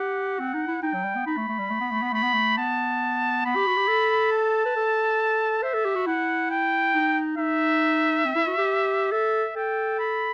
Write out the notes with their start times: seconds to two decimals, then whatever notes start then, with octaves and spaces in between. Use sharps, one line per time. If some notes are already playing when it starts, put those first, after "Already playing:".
Already playing: G4 F#5
0.40 C4
0.54 D#4
0.68 E4
0.82 D#4 G5
0.94 F#3
1.04 G3
1.16 B3
1.26 D#4 B5
1.37 A3
1.49 A3
1.59 G3
1.70 A3
1.81 B3
1.91 A3
2.02 B3
2.13 A3 B5
2.23 B3
2.34 A3
2.58 B3 A5
3.45 B3 B5
3.56 G4
3.67 F#4
3.77 G4
3.88 A4
4.32 A5
4.66 B4
4.76 A4
5.63 C5 E5
5.74 A4
5.85 G4
5.96 F#4
6.07 E4 F#5
6.50 G5
6.95 D#4
7.38 D#4 E5
8.25 C4
8.35 E4
8.47 F#4
8.58 G4
9.12 A4 E5
9.56 A4 G5
9.99 B5